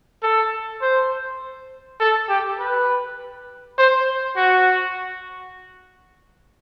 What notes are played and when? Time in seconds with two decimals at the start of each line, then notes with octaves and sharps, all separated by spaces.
0.23 A4
0.82 C5
2.00 A4
2.29 G4
2.59 B4
3.78 C5
4.36 F#4